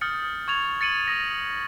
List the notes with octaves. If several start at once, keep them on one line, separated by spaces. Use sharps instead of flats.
D#6 F6 G6 A6 C#7
C#6 G#6 A6 F7
A6 C#7 D#7 F#7
D#6 A#6